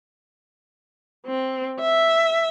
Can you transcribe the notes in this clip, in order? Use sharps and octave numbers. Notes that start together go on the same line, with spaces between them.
C4
E5